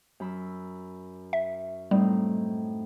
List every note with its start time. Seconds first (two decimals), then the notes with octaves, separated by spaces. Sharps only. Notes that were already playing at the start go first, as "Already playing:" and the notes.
0.20 F#2 B5 E6
1.33 E5
1.91 A2 G3 C4 D#4